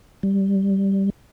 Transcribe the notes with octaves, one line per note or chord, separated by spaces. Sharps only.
G3